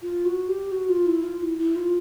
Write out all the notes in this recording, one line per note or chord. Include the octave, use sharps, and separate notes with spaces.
F4
F#4
G4
F#4
F4
E4
F4
E4
E4
F4